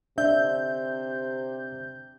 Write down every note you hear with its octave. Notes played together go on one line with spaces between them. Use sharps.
C3 D4 E5 G6